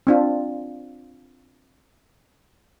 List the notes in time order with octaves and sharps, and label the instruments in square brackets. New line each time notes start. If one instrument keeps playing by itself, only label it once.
[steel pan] C4 D4 F4